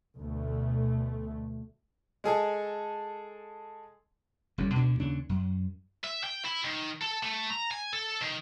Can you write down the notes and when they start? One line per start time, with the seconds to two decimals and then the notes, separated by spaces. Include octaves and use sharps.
0.17 D2 B2 A3
2.24 G#3 G#4 A4
4.58 G1 F2 G3 C#4
4.74 D2 B2 D4
4.99 D#2 C#3 C#4 D4
5.29 F#2
6.04 E5
6.24 G5
6.45 E4
6.65 D#3
7.02 A4
7.23 A3
7.50 A#5
7.71 G#5
7.93 A4
8.22 D#3